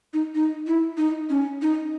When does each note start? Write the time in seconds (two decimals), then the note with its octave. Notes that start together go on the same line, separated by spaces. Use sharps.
0.13 D#4
0.35 D#4
0.67 E4
0.98 D#4
1.30 C#4
1.62 D#4